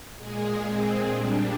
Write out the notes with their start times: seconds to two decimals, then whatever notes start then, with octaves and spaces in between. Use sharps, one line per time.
0.17 A#2 G#3 G#4
0.62 C4
1.06 A#2 G3 D4